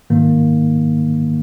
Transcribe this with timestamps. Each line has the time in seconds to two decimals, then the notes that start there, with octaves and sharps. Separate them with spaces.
0.10 G#2 D#3 A#3